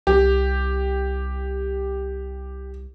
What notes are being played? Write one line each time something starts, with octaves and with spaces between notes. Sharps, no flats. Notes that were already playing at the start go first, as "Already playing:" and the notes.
C2 G4